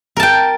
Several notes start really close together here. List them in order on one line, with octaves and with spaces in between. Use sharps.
A#4 A5 G5